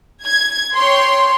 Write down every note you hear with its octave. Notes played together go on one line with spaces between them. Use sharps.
G#6
C#5 G5 C6